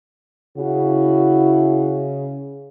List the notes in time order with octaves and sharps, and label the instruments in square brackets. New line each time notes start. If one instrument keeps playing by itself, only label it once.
[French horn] C#3 [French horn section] E4 F#4